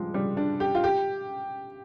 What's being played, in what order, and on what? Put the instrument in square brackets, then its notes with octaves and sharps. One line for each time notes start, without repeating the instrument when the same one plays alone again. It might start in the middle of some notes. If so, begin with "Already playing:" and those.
Already playing: [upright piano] F3 G3 G#3
G3
D4
G4
F4
G4